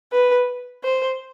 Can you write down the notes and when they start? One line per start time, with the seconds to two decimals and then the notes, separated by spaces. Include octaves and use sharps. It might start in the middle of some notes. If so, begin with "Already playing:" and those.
0.13 B4
0.84 C5